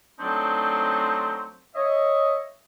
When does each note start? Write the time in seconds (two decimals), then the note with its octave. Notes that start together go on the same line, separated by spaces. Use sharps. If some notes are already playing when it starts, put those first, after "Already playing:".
0.19 F#3 A3 C4 D4 D#4 C5
1.75 C#5 D#5 E5